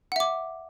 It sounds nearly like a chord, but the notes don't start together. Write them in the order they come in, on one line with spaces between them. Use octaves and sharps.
F#5 E5 D6